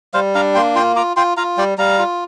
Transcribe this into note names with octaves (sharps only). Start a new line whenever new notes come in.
G3 C5 F5
D4 F5 A#5
A#3 G5 C6
F4 G5 C6
F4 A#5 D6
F4 G5 C6
F4 F5 A#5
G3 D5 G5
G3 F5 A#5
F4